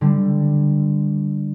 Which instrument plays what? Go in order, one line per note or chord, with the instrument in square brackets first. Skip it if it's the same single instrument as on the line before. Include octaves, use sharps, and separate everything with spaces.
[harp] D3 G3